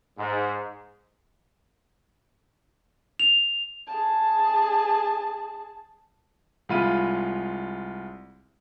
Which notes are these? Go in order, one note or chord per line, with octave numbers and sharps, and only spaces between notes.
G#2
F7
G#4 A5
C2 G#3 F4 B5 D#7